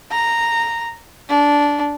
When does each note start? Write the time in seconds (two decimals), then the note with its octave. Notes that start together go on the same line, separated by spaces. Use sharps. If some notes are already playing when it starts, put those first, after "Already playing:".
0.12 A#5
1.29 D4